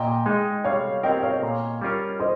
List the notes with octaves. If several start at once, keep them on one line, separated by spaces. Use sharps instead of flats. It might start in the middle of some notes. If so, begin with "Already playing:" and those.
Already playing: A#2 D#5 G5
G#3 D#4
G3 C#5 F5
C4 G4 A#4 D#5 G5
C#5 F5
A#2
G3 C#4 F4 A#4
C5 D#5